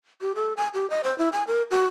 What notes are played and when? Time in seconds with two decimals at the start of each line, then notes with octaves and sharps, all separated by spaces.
0.21 G4
0.35 A4
0.57 G#5
0.74 G4
0.90 D#5
1.04 C5
1.18 E4
1.33 G#5
1.47 A#4
1.71 F#4